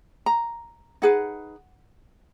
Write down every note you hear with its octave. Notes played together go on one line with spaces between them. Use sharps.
A#5
D#4 G#4 B4 F#5